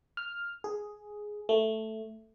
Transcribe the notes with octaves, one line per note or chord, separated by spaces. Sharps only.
F6
G#4
A3